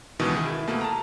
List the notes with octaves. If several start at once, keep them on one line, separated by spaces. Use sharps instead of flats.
C#2 B2 D#3 E3
D#3 G#4
E4
B2 A3 A#3
A5 A#5